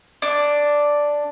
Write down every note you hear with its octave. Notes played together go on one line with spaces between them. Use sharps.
D4